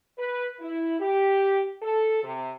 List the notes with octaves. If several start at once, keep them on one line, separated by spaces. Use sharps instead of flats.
B4
E4
G4
A4
C3